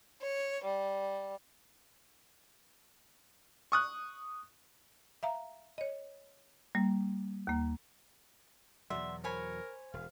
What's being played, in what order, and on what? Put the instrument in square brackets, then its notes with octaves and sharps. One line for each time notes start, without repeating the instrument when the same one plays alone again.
[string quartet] C#5
G3
[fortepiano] C#6 D#6 F#6
[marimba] E5 F5 A#5
C#5 D#5
G3 A#3
D#2 A#3
[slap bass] E2 B2 F#3 [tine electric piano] D5 F#5 C6 [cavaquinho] E5
[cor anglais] A#4 [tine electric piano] C5 [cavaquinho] C#5 G#5 B5
[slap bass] E1 [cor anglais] F5